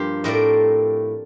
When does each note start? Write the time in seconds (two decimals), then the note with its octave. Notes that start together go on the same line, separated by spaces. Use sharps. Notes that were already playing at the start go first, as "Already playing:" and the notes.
Already playing: G2 F3 A#3 F4 G4 C5
0.24 A2 A3 C4 A#4 D5